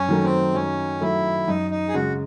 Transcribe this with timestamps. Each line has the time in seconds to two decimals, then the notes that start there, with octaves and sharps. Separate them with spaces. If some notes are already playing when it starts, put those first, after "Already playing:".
Already playing: F#2 C#4
0.09 D#3 F#3 A3
0.24 C4
0.54 F#2 C#4
1.01 D#3 F#3 A3 E4
1.47 F#2 D#4
1.71 D#4
1.89 G#4
1.94 C#3 G#3 F#4